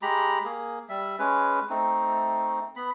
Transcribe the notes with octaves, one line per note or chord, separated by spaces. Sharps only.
G#3 G4 A#5 B5
A#3 G#4
G3 E5
G#3 C#4 B4
A3 C4 D#4
B3 B5